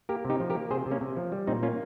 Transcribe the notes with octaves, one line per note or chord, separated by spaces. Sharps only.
A#3 G4 A#4
C3
D#4 G4
F3
G4 A#4
A#3
C3 G#4 C5
C3
A#3 C#4
C3
F3
G3
A#2 C4 D#4
A#3 C#4 F4